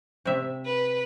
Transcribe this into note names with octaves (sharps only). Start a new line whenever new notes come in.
C3 E5
B4